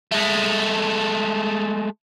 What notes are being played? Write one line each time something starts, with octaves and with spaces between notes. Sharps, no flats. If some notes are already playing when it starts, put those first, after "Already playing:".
G#3 A3